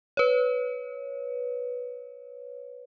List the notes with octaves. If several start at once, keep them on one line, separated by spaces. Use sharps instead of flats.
B4 C#5